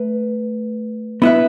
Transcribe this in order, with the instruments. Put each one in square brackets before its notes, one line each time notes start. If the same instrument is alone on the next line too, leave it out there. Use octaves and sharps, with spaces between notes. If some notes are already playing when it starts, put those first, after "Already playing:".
Already playing: [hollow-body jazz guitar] A3 B4
B3 E4 B4 E5